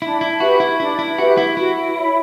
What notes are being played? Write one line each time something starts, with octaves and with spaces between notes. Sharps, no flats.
D4 E4
E4
F#4 G4 B4 E5
E4
D4 E4
E4
F#4 G4 B4 E5
E4
E4 F#4
C#5 E5 B5